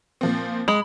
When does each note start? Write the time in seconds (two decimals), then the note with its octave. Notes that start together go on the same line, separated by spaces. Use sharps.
0.21 A#2 F3 C4
0.68 G#3 B5 F#7